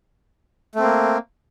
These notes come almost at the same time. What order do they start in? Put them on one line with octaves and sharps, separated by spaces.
A3 C4 A#3